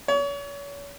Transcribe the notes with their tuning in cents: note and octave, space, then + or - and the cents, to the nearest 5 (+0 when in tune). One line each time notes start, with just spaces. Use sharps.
C#5 +35